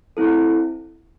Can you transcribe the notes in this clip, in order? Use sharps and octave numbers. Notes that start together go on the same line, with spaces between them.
C4 E4 A4